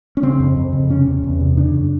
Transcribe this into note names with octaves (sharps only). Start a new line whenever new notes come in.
C#4
C#3 C4
F2
F2
C#3
C3 C#4
E2
E2
C3
C#3 D4
F#2